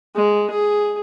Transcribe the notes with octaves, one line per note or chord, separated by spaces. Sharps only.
G#3
G#4